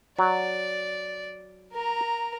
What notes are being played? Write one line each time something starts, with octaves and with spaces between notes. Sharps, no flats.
F#3 D5
A#4 A#5